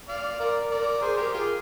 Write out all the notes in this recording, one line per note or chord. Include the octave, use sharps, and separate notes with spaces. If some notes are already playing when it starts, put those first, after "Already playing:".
D5 F5
A#4 D5
A#4 D5
G#4 C5
G4 A#4
F4 G#4